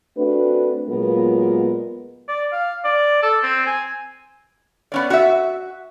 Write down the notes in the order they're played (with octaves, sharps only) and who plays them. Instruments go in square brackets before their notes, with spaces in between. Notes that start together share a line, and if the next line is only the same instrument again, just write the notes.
[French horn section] A3 C4 D4 F#4 B4
A#2 F#3 G#3 B3 F4 A#4
[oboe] D5
F5
D5
A4
C4
G#5
[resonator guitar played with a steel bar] B3 C#4 D5
F#4 E5